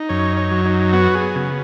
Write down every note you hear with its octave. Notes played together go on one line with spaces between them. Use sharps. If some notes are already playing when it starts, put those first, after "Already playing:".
Already playing: D#4
F#2 C#5
C#5
F#3
D#4
B3 F#4
G#4
C#3